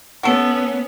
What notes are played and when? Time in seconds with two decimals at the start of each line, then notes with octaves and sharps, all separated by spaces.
0.23 B3 C#4 F#4 A4